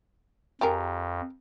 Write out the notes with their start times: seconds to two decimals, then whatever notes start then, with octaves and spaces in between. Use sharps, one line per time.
0.61 F2 G4 G#4 A#4